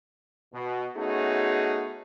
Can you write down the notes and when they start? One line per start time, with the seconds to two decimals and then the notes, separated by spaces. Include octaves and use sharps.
0.54 B2
0.97 A3 B3 C#4 D#4 F#4 G#4